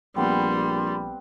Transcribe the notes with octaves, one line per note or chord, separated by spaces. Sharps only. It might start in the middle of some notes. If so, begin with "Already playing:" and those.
A#1 G3 B3 C4 C6